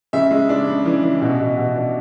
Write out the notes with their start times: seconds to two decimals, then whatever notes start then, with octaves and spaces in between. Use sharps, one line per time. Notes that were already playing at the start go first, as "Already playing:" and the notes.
0.13 C#3 E5
0.31 G#3
0.49 D4
0.67 C#3
0.85 E3
1.03 E3
1.21 B2
1.40 B2
1.58 B2
1.76 D4